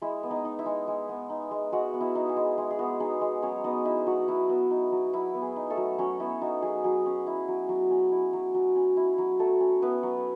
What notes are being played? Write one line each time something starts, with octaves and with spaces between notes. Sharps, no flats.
G#3 E4 E5
B3
D#4 D#5
D#4
E4 E5
G#3
G#3
B3
D#4
G#3
G#3 F#4 F#5
B3
E4 E5
D#4
G#4
G#3
G#3
G#4
B3 F#4
D#4 G#4
G#3
F#3 C#4 C#5
B3 D#4 D#5
D#4 E4 E5
F#3 F#4 F#5
F#3 E4 E5
B3
D#4
F#3
F#3 E4 E5
B3
G#4
D#4
A3 A4
F#3
F#3 C#4 C#5
B3 E4 E5
D#4 F#4
F#3 G#4
F#3 G#4
C#4
E4
F#3
F#3
C#4
E4
F#3
F#3
C#4
E4
F#3
F#3 A3 A4
C#4
B3 E4 B4
F#3